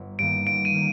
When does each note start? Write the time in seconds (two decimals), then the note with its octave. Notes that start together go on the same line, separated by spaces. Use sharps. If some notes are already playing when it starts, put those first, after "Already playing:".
Already playing: G1
0.19 G2 D#3 A#3 D7
0.46 G1 D7
0.65 D#7
0.74 D#3 A#3